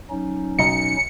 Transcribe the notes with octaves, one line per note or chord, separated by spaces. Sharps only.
F#3 C#4 D#4
B1 D#5 A#5 C#7